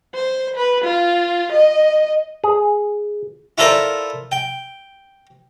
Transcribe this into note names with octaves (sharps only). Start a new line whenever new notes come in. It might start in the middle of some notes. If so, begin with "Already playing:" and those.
C5
B4
F4
D#5
G#4
E4 F4 A4 A#4 C5 D5
G5